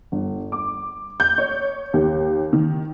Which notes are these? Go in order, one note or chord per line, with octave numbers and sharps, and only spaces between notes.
G1
D6
G6
C#5
D#2
D#3